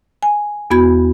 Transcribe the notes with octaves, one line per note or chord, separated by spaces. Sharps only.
G#5
E2 B3 F#4 B5 G#6